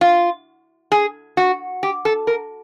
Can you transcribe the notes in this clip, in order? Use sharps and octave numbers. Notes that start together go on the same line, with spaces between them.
F4
G#4
F#4
G4
A4
A#4